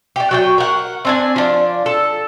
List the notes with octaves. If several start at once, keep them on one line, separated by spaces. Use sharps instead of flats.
G4 D5
F#3 D5 G5
A#4 F#5
C4 D4 G#5
F3 D4
A4